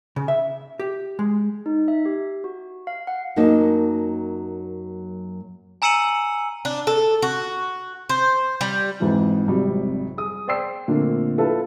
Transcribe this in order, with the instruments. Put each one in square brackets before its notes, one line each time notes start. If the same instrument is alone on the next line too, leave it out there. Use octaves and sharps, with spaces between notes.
[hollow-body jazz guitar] C#3
E5
G4
G#3
[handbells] D#4
E5
G4
F#4
F5
F#5
[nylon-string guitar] F#2 F#3 A#3 D#4 A5
[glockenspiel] G#5 A#5 E6 C#7 D#7 F#7
[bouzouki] D4
A4
F#4
C5
G3
[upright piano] F2 G#2 E3 F3
G#1 F2 C3 F#3 G3
G#4 D#6
C5 D5 G5 C6 E6 C7
A#2 D3 A3 A#3 C4
E4 F4 A4 B4